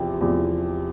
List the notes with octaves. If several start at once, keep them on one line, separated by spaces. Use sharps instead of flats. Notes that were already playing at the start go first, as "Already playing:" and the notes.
Already playing: E2 C3 F3
E2 C3 F3